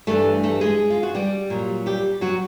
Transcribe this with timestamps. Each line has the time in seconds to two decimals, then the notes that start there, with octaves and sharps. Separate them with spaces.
0.07 G2 E3 G3 A3 A4
0.43 A3 A4
0.61 G#3 G#4
0.90 F4
1.03 F#4
1.15 G3 G4
1.50 A#2 F#3
1.86 G3 G4
2.21 F#3 F#4